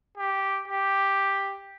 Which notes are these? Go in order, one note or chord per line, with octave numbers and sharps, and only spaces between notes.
G4
G4